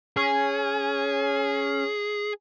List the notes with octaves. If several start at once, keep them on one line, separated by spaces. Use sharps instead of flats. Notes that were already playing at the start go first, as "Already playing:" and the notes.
C#4 G#4